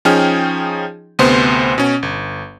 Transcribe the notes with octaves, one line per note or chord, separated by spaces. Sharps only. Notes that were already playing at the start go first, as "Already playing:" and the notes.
F3 C#4 D#4 G#4 G5 F6
D2 C3 B3 C5 C6
B2 C#4
G1